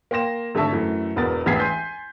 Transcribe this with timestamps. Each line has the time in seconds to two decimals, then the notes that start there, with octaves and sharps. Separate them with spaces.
0.11 A#3 G5 C6 A#6 E7
0.55 G#1 D3 A3 E5 A5 C#6
0.73 F#2 E3 A3
1.16 E1 E2 B3 F#4 A#4 A6
1.46 E1 A1 B3 G#6 B6 C7
1.60 G#5 C6 G6